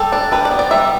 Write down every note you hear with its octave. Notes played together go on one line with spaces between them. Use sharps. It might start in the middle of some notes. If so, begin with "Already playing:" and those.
Already playing: G3 A4
D4
G3 B4
D5
B3
D5
G3 E5